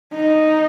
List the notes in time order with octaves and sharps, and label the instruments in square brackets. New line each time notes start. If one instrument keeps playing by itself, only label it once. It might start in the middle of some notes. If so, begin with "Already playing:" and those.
[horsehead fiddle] D#4